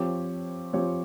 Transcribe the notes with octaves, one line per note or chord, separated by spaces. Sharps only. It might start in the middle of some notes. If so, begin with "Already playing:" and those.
Already playing: F3 C4 G4 C#5
F3 C4 G4 C#5